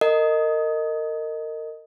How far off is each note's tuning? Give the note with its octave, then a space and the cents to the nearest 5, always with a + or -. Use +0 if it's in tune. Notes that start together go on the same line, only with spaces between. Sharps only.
A#4 -30 D#5 +0